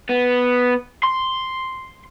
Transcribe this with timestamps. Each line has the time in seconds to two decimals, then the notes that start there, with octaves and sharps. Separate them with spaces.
0.10 B3
1.04 C6